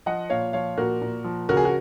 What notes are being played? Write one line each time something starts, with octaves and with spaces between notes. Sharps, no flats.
F3 D#5 F#5
A#2 C#5 F5
F3 C#5 F5
A#2 F#4 A#4
A#2
F3
C#3 F#4 A#4
G#4
F#4